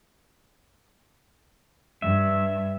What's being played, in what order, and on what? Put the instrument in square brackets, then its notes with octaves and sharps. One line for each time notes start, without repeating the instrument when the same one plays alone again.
[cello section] G2 [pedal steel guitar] E5